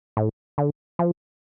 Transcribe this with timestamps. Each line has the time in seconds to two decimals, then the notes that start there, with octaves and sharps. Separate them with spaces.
0.17 A2
0.58 D3
0.99 F3